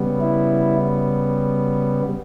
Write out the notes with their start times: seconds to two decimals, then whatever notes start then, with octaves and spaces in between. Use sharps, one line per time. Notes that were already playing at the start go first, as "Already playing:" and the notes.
Already playing: C#3 G3 B3
0.21 E4